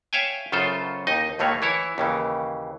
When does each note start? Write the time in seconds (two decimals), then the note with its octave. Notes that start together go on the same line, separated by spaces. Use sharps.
0.13 C#5 E5 F5 G5 G#5
0.52 F#2 C#3 F4 A4 C5
1.07 D#2 D#4 D#5
1.39 D#2 A2 A3 A#3 C#5
1.62 E3 E4 C#5
1.98 D#2 C#3 E3